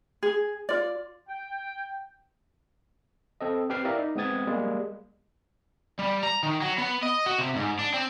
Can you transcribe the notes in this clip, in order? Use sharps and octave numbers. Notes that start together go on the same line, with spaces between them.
G#4
F4 D5
G5
C4 A4 D#5
C4 G4 B4 G5 F6 C7
E4 A#4 D5 E5 F5 A#5
D#4
G#3 B3 C4 D#6 G#6 A6
G3 G#3 A#3
G3
A#5
D#3
F#3
B3
D#5
F#4
C3
G#2
D4
C4